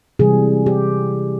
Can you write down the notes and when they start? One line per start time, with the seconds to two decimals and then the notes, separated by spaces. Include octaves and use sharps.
0.19 C3 E3 G3 G#4
0.66 G4